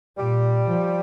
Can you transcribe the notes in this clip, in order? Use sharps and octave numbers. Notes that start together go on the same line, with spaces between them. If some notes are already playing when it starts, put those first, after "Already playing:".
A#2 G3
F3